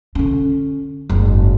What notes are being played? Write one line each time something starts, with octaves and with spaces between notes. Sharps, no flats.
D3 C#4
F#1 G#2